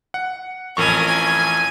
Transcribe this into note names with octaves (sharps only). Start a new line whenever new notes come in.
F#5
A1 F2 A#4 G#5 C#6
G#5